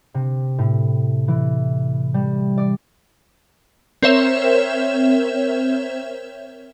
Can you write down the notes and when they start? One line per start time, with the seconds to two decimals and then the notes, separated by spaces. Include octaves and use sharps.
0.14 C3
0.58 A2
1.28 E3
2.14 G3
2.58 D5
4.02 C4 A#4 C5 C#5 E5 E7